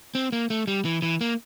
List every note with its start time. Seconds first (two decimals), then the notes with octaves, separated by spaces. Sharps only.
0.15 C4
0.32 A#3
0.50 A3
0.67 G3
0.85 E3
1.02 E3
1.21 A#3